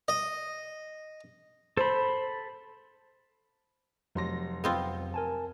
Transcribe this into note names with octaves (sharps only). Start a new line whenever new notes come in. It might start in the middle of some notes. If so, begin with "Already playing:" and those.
D#5
A4 C5 B5
F1 F2 F#3 C6 A#6
B3 C4 F4
A#4 G#5 A5